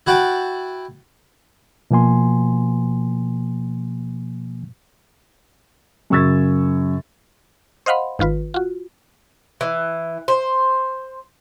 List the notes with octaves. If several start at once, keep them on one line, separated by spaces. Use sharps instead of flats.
E4 F#4 F#5 G5 A5
B2 F3 A#3 G#5 C6
F#2 C#3 C#6 E6 G#6 A6
C5 D#5 F5 F#5 B5 C6
G#1 D#3 F4 B4
F4 F#4
E3
C5